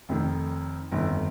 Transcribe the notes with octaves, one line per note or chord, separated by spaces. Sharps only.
F1 F2 D#3
G1 F2 D#3